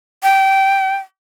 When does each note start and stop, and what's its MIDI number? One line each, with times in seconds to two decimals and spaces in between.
0.23 0.94 79